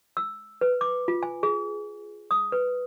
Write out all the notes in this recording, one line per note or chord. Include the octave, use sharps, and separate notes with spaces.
E6
B4
D6
F4
G#5
G#4
D#6
B4